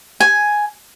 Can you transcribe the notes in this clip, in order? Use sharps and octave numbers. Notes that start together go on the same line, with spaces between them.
G#5